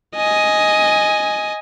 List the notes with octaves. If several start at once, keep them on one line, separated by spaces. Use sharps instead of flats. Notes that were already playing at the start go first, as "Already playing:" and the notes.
D#5 G#5